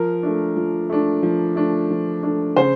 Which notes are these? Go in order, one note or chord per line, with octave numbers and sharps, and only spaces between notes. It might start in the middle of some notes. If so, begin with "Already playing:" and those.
Already playing: F3 A#4
A3 D4
F3
A3 D4
F3
A3 D4
F3
A3 D4
C#3 C5